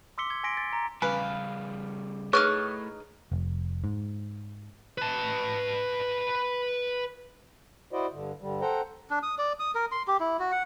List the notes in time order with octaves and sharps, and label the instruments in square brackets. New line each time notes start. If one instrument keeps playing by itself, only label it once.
[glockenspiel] C6 D6 E6 B6 C#7 G7
G#6 C#7 G7
G#5 C6 A#6 B6 D7
A6
A#5
[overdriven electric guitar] C#3 G3 [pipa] B4 [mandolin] F5 [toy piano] G#5
[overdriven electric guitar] A2 [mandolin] D#4 F6 F#6 [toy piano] G#4 B4 C#6 [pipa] C#5
[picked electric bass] F1
G#2
[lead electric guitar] B4 A5
[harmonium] E4 F#4 C5 D5 D#5
G2 D3
G2 D3 G3
A4 C5 F#5 G5 A#5
[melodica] D4
D#6
D5
D#6
A#4
C6
G4
E4
F#4
F#5